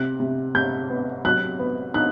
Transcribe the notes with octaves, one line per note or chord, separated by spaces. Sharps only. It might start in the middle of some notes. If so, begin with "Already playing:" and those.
Already playing: C3 F#6
C3
C3 G6
B3
F#3 F#6
B3
D#4 F#6